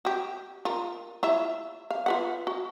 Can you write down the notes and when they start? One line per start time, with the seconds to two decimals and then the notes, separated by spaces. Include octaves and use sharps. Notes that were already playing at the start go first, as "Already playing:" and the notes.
0.05 F#4 G4
0.65 F4 A#4
1.23 E4 F4 E5
1.91 F5
2.06 F4 B4 F#5
2.47 F#4